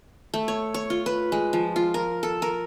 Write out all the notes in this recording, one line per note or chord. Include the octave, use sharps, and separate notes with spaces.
A3
C#5
C#5
F4
B4
G#3
F3
F4
A#4
A4
A#4